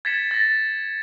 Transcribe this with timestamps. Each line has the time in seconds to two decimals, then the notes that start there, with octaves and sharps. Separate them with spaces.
0.05 G#6 A6 B6 C#7 E7
0.31 A6 A#6